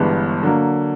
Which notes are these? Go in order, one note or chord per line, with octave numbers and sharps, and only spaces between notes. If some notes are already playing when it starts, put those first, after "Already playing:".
Already playing: G1 G2 E3 G#3 B3
D3 F#3 A#3